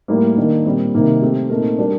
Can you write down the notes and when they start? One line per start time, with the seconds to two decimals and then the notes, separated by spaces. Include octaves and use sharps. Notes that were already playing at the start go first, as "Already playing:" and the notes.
0.08 A2 G3 A#3
0.37 D#3 A#3 D4
0.65 A#2 G3 C4
0.94 C3 D#3 A#3 D#4
1.22 A3 C4 G4
1.50 A#2 A3 C4 D#4 A#4
1.79 G3 D4 G4 A#4